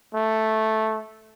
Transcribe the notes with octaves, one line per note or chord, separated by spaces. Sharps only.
A3